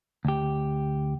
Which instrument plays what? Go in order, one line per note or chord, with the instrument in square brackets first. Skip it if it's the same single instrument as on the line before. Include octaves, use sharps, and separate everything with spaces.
[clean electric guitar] D2 G4